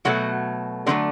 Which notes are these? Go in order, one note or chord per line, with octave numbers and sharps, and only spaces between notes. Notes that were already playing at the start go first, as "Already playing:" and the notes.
B2 F#3 A3 F#4
D3 F#3 A3 C4